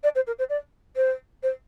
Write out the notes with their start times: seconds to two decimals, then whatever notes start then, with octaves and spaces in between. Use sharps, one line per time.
0.03 D5
0.15 C5
0.27 A#4
0.38 C5
0.49 D5
0.96 C5
1.43 C5